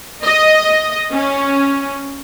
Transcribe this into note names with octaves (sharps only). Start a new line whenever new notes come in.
D#5
C#4